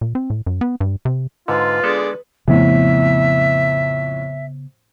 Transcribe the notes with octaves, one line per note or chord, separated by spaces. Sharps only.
A#2
C4
A2
F#2
B3
G2
C3
G#2 D3 F4 B4
D3 G#3 B3 G#4 A4 D5
F2 A2 C#3 B3 E5